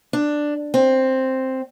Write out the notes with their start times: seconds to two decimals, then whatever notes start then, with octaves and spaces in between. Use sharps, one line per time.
0.13 D4
0.74 C4